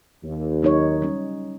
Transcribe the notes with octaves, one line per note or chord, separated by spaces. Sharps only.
D#2
F#3 D#4 C#5
G3 C#4